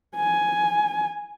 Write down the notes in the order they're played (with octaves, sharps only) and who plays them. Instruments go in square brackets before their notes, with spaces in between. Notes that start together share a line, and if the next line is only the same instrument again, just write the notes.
[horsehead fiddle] G#5